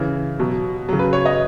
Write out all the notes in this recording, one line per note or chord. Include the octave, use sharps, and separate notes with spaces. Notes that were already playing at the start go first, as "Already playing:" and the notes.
Already playing: C#3 E3
B2 F#3
C#3 F#3
B4
C#5
D#5